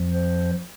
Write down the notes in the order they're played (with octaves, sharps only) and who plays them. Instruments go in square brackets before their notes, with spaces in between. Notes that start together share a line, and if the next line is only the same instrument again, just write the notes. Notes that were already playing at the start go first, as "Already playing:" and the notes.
Already playing: [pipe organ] F2 F3
C5